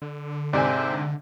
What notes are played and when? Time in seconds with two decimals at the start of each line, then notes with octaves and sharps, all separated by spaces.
0.02 D3
0.53 G#2 C3 C5 D5 E5 G5 G#5